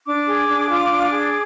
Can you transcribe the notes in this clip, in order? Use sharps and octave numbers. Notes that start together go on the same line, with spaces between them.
D4 D6
G#4
D4
F4
D4
G#4